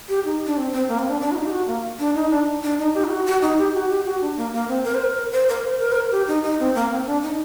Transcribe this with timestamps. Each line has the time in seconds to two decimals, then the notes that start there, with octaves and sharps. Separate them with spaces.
0.09 G4
0.25 D#4
0.46 D4
0.57 C4
0.73 C4
0.88 A#3
0.99 C4
1.09 D4
1.20 D4
1.32 F#4
1.36 D#4
1.46 G4
1.52 F#4
1.67 A#3
1.99 D4
2.15 D#4
2.31 D4
2.63 D4
2.79 D#4
2.94 G4
3.04 D#4
3.10 F#4
3.26 F#4
3.42 D#4
3.58 G4
3.74 F#4
3.89 G4
4.05 F#4
4.21 D4
4.37 A#3
4.53 A#3
4.69 C4
4.85 A#4
4.95 C5
5.04 A#4
5.32 C5
5.49 A#4
5.64 C5
5.80 A#4
5.92 C5
5.95 A#4
6.11 G4
6.28 D#4
6.44 D#4
6.60 C4
6.75 A#3
6.91 C4
7.07 D4
7.23 D#4